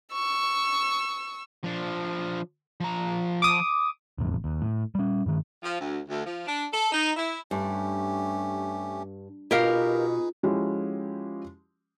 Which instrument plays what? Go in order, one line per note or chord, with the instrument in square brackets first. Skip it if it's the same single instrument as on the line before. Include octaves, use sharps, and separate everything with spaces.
[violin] C#6 E6
[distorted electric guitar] F3 D4
F3 A#5
[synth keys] D6 D#6
[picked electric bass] E1 A1 F2
D#2
A2
G3 C#4
G2 D#3
[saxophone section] F3
D2
D2
F3
D4
A4
D#4
E4
[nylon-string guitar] G2 [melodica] A3 C#4 G4
[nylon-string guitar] B2 [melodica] D#4 G#4 B4 [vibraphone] F4 [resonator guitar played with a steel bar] G4 A#4 F5
[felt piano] F3 G#3 C#4 E4 F#4 G4